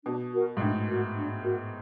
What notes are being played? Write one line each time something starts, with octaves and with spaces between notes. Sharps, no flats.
B2 D4
F#4 A#4
G#2
A2 D4
F#4 A#4
D4
F#4 A#4